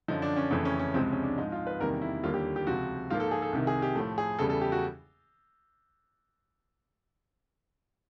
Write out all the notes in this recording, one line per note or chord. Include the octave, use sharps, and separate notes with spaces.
F#2 D3 F3 D#4
D4
C#4
F2 C#3 E3 A3 C4
C#4
C#4
C#2 C3 F3 G#3 C4
C#4
D4
G#2 F3 G#3 D#4
F4
B4
E2 C3 D#3 G3 A#3 A#4
E4
D#2 D3 G3 A#3 F4
G4
G4
C#2 C3 F3 F#4
G#2 F3 A#3 F4
A4
G#4
A4
C2 C3 D#3
G#4
G4
A2 F3 A3
G#4
E2 C#3 E3 G3 A4
A4
G4
F#4